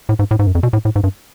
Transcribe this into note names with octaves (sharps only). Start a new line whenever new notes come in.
A2
G#2
A2
G#2
F#2
F2
B2
A2
A2
G#2
G2